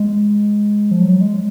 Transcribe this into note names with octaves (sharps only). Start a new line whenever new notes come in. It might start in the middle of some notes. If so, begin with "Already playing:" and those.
Already playing: G#3
F3
F#3
G#3